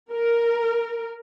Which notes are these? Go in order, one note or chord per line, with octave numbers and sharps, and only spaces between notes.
A#4